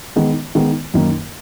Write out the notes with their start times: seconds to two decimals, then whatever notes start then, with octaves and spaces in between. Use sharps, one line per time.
0.16 D#3 G#3 B3
0.55 D#3 G#3 B3
0.94 F#2 D#3 A#3